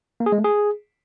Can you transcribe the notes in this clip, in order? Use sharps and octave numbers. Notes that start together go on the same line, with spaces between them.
A#3
G#4
G#3
A3
G#4